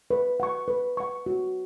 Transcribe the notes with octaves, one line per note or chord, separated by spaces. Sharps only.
B4
F#5 C#6
B4
F#5 C#6
F#4